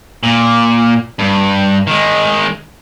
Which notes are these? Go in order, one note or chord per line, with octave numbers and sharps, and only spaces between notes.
A#2
G2
D#3 G#3